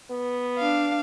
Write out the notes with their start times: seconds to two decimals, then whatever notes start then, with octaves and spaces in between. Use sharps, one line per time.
0.11 B3
0.58 D4 F5